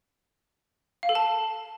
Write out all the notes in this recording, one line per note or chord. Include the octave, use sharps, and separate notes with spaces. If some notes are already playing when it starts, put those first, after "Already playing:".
F5
A4
A5